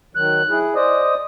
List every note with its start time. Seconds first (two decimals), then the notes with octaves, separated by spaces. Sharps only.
0.15 D#3 F#3 F#6
0.49 E4 G#4
0.75 C5 D5 D#5 D#6